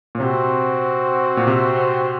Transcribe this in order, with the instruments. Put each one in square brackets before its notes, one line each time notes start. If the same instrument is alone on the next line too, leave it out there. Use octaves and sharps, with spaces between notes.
[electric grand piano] A#2
[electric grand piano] C3 [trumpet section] C4 F#4 C5
[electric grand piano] A#2
C3